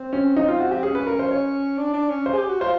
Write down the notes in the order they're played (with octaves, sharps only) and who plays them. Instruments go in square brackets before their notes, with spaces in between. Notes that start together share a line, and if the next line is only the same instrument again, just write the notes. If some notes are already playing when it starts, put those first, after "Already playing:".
Already playing: [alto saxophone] C4
[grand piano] C#4
D#4
F4
F#4
G4
[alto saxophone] C#4 [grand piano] G#4
[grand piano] B4
A#4
C5
C#5
[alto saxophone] D4
D4
C#4
[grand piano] C5
[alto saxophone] G#4
G4
F#4
[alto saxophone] F4 [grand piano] C5